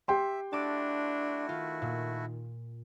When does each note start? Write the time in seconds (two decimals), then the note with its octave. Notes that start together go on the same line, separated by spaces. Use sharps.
0.08 G4 E5 G5 C6
0.53 A3 D4 E4 F#4 A5 D6
1.49 D#3 F4
1.82 A#2